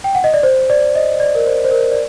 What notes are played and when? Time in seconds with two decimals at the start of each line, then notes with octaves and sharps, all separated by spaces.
0.04 G5
0.15 F#5
0.24 D#5
0.34 D5
0.43 C5
0.70 D5
0.95 D#5
1.20 D5
1.35 A#4
1.46 C5
1.64 C5
1.71 A#4
1.91 D5